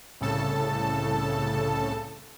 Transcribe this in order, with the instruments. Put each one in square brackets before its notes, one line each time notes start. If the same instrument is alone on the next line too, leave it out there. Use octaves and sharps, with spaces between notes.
[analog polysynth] C2 A2 C#3 A4 A5